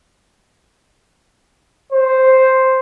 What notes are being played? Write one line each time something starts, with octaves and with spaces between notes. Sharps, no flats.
C5